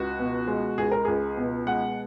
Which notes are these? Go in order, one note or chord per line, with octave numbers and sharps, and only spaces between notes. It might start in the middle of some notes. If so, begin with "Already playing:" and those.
Already playing: C#2 F#4
B2
G#3
C#2 G#4
A#4
C#2 G#4
B2
G#3 F#5